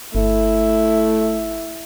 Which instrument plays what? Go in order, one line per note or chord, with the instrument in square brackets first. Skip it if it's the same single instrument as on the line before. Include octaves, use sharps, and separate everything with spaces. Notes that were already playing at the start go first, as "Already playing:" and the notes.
[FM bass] G1 [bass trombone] A3 [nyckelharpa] E4